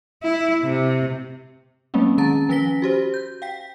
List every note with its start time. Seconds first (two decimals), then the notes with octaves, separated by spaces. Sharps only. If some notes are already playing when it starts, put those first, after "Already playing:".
0.24 E4
0.64 C3
1.94 F#3 G#3 A#3 C4 C#4
2.18 D#3 C#4 A5 A#5 A6
2.49 F3 C#4 B4 A#6 B6 G7
2.82 F#4 G4 C5
3.14 G6
3.42 F5 G5 B6